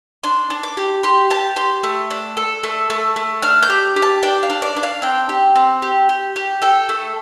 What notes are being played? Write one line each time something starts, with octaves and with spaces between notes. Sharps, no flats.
D4 C6
D4
D6
G4
G4 C6
G4 A5
G4 C6
A3
D4
A4
A3
A3
A3
D4 F6
G6
G4
G4
A5
D4 G5
F5
D4
D5
D4
F5
C4 G5
G4
C4
G4
G4
G4
A4 G5
A3